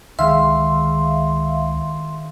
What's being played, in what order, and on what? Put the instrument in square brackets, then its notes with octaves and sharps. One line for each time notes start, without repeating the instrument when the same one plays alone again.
[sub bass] C#2 [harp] D#3 G#3 [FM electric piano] E5 F5 [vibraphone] C6